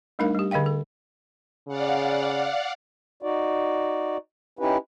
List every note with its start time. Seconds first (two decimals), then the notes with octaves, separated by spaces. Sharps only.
0.19 G3 A3 D4 D#4 A#4 F5
0.35 G3 G4
0.51 D3 G#4 D#5 F5 G5
0.66 A4
1.68 C#3 D5 F5 F#5
3.23 D#4 F#4 D5
4.59 C#4 D#4 E4 G4 B4